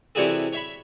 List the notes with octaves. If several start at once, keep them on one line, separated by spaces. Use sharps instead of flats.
C3 E3 G3 F#4 G#4 A4
C#5 E5 B5